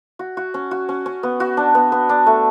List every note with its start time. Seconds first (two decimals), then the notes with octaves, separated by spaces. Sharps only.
0.19 F#4
0.37 F#4
0.54 C#4
0.71 F#4
0.89 C#4
1.06 C#4
1.23 B3
1.40 F#4
1.57 D4
1.75 B3
1.92 B3
2.09 D4
2.26 A3